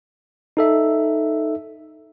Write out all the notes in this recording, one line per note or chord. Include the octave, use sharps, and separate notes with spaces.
D#4 A4 E5